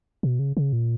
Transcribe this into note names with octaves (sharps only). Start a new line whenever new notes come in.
B2
C#3
C#3
A#2